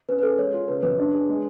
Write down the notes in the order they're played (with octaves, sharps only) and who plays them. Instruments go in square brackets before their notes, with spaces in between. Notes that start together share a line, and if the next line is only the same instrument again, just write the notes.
[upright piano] C#4 [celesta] B4
[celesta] B4
[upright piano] G#4 [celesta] A4
[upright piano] G#3 [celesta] C#5
[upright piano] F4
[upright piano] C#3 [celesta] B4
[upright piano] F#2 [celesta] B4
[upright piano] D4
G#4
G#3